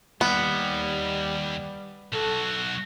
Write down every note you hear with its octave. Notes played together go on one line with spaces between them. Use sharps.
D#2 G3 B3
B1 F#4 A4